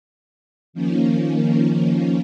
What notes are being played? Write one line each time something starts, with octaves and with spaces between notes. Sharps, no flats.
D#3 F3 A#3 C#4